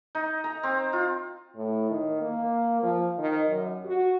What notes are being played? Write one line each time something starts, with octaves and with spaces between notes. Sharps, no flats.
D#4
A#5
C4
F4
A2
D#3
A#3
F3
D#3
F#2
F#4